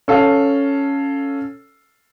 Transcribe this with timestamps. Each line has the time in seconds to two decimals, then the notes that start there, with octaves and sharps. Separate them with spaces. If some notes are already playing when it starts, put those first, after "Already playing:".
0.08 C#4 A4 F5